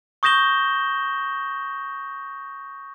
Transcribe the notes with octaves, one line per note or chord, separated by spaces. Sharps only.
C#6 D#6 G6 A#6 E7 G7